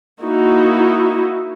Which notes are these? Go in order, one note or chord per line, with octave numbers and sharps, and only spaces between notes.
A#3 D#4 E4 F#4